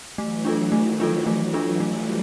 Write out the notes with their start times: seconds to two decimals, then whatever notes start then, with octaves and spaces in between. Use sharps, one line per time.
0.18 E3 F#3 A3
0.45 D4 F4 A4
0.72 D#3 F3 A3
1.00 D4 F4 A4
1.26 E3 F#3 A3
1.53 D4 F4 A4
1.80 F3 G3 A3